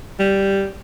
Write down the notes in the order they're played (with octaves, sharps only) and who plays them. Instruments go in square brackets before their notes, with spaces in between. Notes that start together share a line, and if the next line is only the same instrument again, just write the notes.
[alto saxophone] G3